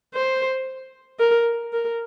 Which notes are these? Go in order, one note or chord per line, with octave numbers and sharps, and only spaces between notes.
C5
A#4
A#4